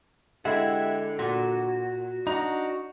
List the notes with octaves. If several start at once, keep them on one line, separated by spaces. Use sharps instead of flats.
D3 G#3 E4 G4 E5 F#5
A#2 F#4
D4 D#4 F#4 A#5